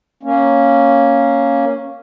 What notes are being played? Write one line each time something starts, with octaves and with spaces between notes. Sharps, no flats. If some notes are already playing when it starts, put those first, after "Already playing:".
A#3 C#4